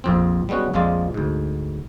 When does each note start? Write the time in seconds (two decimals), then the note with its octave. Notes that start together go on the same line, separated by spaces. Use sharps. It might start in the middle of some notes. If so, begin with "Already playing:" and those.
0.04 A#1 F2 C4
0.49 G3 G#3 B3 C#4 F#4
0.74 A#1 F2 F3 G#3 F4 D5
1.14 D2 G#2